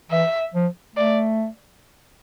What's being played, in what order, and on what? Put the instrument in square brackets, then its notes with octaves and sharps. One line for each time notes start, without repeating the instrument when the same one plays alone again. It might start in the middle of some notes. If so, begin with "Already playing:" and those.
[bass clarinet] E3 [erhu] E5
[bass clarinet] F3
[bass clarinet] A3 [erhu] D5